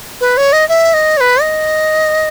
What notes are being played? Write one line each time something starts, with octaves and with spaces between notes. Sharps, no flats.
B4
C#5
D#5
E5
D#5
C#5
B4
D#5